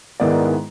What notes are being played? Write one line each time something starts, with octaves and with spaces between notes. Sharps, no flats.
G#2 D#3 G#3 B3 E4 D5